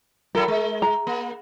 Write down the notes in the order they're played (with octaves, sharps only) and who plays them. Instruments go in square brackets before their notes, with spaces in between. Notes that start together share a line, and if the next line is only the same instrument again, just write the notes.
[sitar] F#3 E4 A4 [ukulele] A#4
[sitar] G#3
[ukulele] A#5
[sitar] A#3